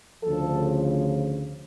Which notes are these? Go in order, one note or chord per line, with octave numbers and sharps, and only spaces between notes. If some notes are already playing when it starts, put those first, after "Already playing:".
D2 C#3 F3 A4